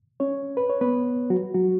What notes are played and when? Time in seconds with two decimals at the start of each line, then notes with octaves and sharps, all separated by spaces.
0.20 C#4 C#5
0.57 B4
0.69 C#5
0.81 B3 B4
1.30 F#3 F#4
1.54 F#3 F#4